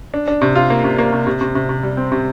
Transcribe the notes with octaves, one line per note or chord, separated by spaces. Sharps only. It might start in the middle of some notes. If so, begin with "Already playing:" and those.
D4
D4
C3
F4
A#3
C3
A#3
C3
C3
C3
C3
C3
G3
C4
C3